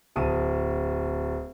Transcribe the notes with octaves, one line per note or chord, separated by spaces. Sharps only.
D1 A5 D#6 D#7